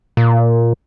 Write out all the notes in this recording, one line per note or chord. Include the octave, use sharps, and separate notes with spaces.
A#2